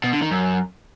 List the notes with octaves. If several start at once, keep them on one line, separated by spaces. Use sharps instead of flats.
B2
D3
D#3
F#2